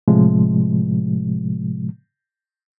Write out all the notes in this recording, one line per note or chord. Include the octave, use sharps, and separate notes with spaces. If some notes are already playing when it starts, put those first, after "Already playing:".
A2 C3 F3 G#3